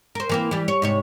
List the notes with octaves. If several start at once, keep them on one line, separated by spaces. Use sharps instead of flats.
A#4 C5
E3 A#3 C4
E3 G3
C#5
G#2 C3 C#5